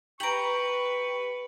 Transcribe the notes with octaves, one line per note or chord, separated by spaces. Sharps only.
G4 B4 A#5 C#6 D7 F#7